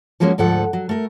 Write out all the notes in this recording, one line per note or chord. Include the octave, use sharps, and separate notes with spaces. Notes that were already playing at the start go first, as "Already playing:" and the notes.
F3 F#3 G#3 A#3 C4 C#4
D2 G#2 F3 A4 F#5
F#3
A3 A#4